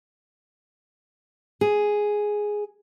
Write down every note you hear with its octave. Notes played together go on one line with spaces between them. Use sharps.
G#4